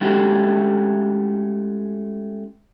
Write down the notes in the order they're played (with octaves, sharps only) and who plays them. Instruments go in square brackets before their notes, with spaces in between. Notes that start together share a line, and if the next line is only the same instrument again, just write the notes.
[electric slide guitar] G#3 A3 C#4 E4 F#4 G4